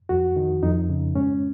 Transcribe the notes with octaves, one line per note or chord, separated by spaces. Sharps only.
F2 F#4
D#3
F2 D#4
C#3
G#2 C#4